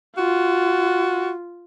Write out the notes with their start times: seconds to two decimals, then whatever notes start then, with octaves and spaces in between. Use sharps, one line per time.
0.17 F4 F#4